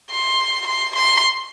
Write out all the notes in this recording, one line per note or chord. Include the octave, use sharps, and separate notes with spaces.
C6
C6
C6